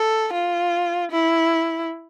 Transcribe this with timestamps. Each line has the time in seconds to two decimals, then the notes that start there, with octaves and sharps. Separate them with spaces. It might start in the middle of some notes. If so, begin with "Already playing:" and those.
Already playing: A4
0.33 F4
1.11 E4